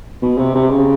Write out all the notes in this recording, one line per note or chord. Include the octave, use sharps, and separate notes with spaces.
B2
C3
C3
C#3